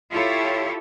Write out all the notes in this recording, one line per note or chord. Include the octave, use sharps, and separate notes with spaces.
E4 F4 G4 A4 C#5